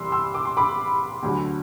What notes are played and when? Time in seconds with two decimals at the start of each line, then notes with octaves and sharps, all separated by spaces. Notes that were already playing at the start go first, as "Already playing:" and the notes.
Already playing: C2 C3 E3 G3 B5 C6 D6 E6
0.12 C6 E6
0.34 D6
0.45 C6
0.57 B5 D6
1.23 D2 D3 F#3